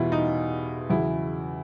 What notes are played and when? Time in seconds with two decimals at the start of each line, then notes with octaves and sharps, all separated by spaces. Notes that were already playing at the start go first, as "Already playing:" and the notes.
Already playing: E2 B2 G3 E4 F4
0.12 D#4
0.90 E2 C#3 F#3 E4